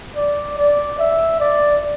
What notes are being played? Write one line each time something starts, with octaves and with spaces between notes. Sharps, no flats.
D5
D5
E5
D5